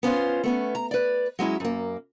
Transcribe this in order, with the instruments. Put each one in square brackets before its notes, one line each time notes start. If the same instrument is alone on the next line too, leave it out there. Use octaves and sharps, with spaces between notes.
[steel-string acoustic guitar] B3 C#4 F4 C5
A3 B3 C#4
A#5
B4 D5
F#3 G#3 C#4 E4
F#2 A#3